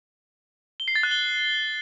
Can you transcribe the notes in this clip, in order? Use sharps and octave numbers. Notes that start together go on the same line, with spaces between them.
G7
C7
A6
F#6
G7